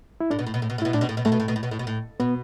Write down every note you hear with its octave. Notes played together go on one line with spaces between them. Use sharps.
E4
A2 D4
B2
A2
B2
A2
B2
A2
B2 E4
A2 D4
B2
A2
B2
A2 A3
B2
A2
B2
A2
B2
A2
B2
A2
B2 B3